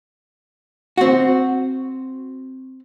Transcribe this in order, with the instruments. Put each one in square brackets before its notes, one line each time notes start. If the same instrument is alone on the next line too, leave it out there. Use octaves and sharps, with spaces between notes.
[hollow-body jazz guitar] C4 F#4